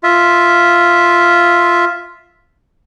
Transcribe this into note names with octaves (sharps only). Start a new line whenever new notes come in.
F4 E5